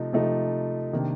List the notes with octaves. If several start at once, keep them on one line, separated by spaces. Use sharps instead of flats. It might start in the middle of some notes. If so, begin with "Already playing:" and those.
Already playing: C3 F3 A3 D#4
C3 F3 A3 D#4
C3 D#3 A#3 D4